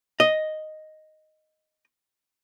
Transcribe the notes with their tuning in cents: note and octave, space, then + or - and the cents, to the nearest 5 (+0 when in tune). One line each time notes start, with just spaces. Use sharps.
D#5 +0